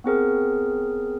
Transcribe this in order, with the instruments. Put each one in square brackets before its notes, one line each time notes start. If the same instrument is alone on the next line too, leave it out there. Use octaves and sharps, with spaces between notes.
[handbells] B3 C4 G#4 A#4